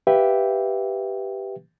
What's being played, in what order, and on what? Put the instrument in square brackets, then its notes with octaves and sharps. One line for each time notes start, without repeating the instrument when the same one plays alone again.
[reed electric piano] G4 B4 E5 F5 G5